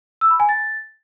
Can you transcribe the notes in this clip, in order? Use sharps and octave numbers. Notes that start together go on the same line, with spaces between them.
E6
B5
G#5
A6